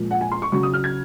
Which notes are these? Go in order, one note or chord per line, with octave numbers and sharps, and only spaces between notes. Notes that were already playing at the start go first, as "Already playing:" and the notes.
Already playing: A#2 F3 G#3
F#5
G#5
C6
C#6
C#3 F#3 C#6
D#6
F6
G#6